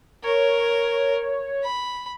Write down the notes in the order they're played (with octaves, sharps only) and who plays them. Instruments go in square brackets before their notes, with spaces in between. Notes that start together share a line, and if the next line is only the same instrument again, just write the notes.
[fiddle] A#4 [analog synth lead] C#5
[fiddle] B5